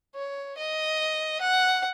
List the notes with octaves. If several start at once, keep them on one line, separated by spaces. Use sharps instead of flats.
C#5
D#5
F#5